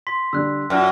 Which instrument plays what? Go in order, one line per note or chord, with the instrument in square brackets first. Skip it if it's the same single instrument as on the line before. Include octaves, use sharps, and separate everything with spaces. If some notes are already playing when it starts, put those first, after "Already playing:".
[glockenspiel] C6 B6
[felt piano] D3 G3 [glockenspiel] E6 F#6
[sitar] F#2 [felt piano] F4 D5 [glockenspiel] F6